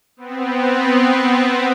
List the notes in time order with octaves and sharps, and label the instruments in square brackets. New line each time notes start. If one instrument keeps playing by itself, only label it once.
[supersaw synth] B3 C4